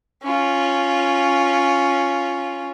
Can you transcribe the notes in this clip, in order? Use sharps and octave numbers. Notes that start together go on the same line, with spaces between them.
C#4 F4